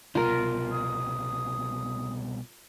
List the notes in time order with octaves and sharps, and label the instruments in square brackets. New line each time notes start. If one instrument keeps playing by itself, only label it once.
[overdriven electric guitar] C2 B2 [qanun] F4 A#4
[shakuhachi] D#6